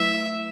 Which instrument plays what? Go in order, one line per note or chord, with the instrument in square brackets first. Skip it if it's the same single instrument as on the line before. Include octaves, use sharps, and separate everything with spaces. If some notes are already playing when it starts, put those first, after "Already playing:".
Already playing: [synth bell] F#3 A3 E4 B4 [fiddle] E5